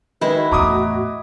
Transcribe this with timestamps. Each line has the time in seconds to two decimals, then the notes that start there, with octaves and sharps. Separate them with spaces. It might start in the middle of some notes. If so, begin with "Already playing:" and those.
0.21 D#3 G#3 E4 B4
0.36 F#4
0.52 E2 A2 A#5 D6 D#6